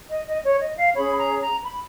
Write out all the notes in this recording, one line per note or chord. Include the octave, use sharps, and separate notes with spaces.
D#5
D#5
C#5
D#5
F5
C#4 G#4 C#5 B5
A#5
A#5
B5